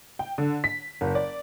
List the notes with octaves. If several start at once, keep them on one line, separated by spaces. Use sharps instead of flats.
G5
D3
B6
F#1
D5